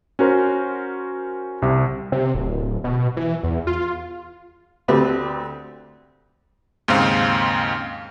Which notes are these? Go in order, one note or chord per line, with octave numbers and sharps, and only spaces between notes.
C#4 F#4 A#4 C5
C2 C3
C3
D1
B2
E3
E2
F4
D2 A3 C4 G4 B4
D#2 G#2 C#3 C4 F5